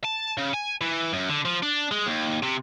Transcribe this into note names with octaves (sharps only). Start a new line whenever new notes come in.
A5
C#3
G#5
E3
F#2
D3
F3
D4
G#3
D#2
C3